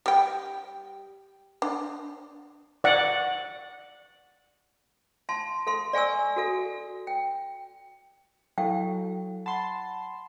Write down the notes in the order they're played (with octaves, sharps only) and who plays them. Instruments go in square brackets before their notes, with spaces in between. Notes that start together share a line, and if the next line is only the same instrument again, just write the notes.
[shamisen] G3 G5
D4
[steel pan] D5 F#5
[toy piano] F5 A5 C6
A4 F5 C6
D5 F5 G#5 C#6 E6
F#4 A4 F5
G5
[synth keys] F#3 [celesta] E4 A4 [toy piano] F5 G5
[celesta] F#5 B5 [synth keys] A5 C6